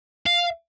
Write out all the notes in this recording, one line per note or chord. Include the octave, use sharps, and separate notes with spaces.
F5